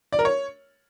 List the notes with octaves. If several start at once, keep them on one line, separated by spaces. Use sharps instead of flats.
D5
A#4
C#5